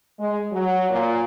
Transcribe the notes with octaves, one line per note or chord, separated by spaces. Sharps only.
G#3
F#3
A#2